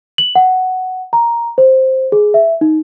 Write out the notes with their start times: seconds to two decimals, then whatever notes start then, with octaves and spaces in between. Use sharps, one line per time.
0.18 F#7
0.35 F#5
1.13 A#5
1.58 C5
2.12 G#4
2.34 E5
2.61 D#4